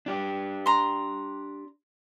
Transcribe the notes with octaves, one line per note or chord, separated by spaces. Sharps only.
D4 G4 D5
A#5 C6